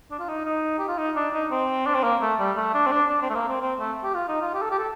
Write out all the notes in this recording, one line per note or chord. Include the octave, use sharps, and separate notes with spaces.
D4
F4
D#4
D#4
G4
F4
D#4
D4
D#4
C4
D4
C4
A#3
A3
G3
A3
D4
C4
D4
D4
C4
A3
A#3
C4
C4
A3
G4
F4
D#4
F4
G4
A4
G4
A4